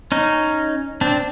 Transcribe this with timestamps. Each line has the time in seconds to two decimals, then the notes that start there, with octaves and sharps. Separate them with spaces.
0.12 C#4 D#4
1.01 C4 D4